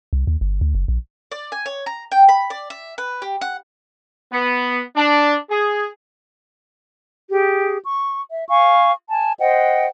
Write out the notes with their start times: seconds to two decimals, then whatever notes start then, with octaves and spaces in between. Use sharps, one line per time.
0.13 C2
0.27 D#2
0.41 G1
0.61 D2
0.75 F#1
0.88 A#1
1.32 D5
1.52 G#5
1.66 C#5
1.86 A#5
2.12 G5
2.29 B5
2.50 D5
2.70 E5
2.98 B4
3.22 G4
3.41 F#5
4.33 B3
4.97 D4
5.51 G#4
7.31 G4 G#4
7.84 C#6
8.31 E5
8.49 F5 G#5 C#6
9.09 G#5 A5
9.40 C5 D#5 F#5 G5